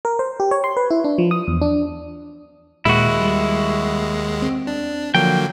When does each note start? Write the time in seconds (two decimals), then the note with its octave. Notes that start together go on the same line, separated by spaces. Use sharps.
0.05 A#4
0.19 C5
0.40 G4
0.51 C#5
0.64 C6
0.77 B4
0.90 E4
1.04 D4
1.18 F3
1.31 D#6
1.47 E2
1.62 D4
2.85 D#2 A#2 G#3 E4 F#4
3.21 G3
4.42 C4
4.67 D4
5.15 D3 F3 F#3 A#3 G5